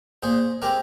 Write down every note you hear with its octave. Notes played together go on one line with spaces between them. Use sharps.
A#2 G#4 C5
G#3 C4 G4 A#4